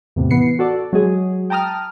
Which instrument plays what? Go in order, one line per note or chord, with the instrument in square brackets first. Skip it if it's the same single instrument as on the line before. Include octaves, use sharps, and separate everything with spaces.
[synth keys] E2 A2 C3
E3 B3 C7 C#7
F#4 A4 D5
F#3 G#3 G#4
G5 A5 A#5 D#6 F6